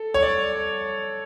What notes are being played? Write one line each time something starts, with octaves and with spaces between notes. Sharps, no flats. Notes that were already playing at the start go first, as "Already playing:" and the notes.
Already playing: A4
C#5
D5